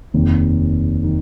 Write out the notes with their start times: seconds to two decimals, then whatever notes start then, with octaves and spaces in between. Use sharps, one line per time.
0.14 F1 D#2 D#3
1.04 D#3